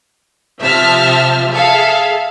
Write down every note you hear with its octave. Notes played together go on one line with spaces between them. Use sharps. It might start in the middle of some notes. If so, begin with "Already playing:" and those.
C3 F3 E5 A5 F6
G#4 A4 E5 F5